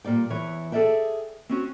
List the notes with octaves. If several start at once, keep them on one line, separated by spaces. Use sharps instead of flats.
A#2 G3 D5 G5
E2 E3 C#5
G#4 A4 B4 D5 E5 G5
C4 C#4 F#4